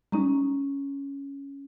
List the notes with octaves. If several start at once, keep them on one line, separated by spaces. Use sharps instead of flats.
G3 G#3 C#4 D#4 A#5